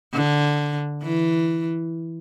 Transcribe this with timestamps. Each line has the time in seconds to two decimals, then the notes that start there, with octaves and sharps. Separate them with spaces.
0.13 D3
1.03 E3